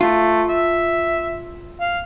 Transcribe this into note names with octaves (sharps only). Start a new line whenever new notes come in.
A3 F4
E5
F5